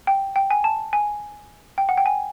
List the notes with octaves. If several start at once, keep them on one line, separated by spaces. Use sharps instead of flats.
G5
G5
G#5
A5
G#5
G5
F#5
G5
G#5